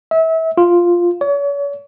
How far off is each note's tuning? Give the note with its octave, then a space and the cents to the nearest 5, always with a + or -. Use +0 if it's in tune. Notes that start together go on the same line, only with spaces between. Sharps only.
E5 -30
F4 +0
C#5 +40